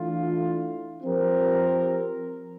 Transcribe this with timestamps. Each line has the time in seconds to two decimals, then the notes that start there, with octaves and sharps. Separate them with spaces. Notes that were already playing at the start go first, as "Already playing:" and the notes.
Already playing: E3 A3 D4 F4
1.03 F3 C4 G4 A#4